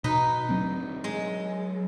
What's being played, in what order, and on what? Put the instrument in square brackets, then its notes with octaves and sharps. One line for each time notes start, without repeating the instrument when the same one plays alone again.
[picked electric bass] B2 [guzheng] D#4 B4
[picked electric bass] F#3 C4 D4
[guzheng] G#3